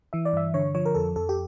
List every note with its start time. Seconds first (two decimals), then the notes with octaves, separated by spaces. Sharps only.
0.13 E3 E5
0.25 D5
0.33 G2 E5
0.54 D3 C#5
0.75 F3 C#5
0.85 A#4
0.95 F2 A4
1.16 F2 A4
1.29 G4